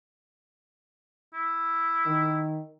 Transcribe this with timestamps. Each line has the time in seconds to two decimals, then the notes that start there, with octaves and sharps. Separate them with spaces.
1.34 E4
2.06 D#3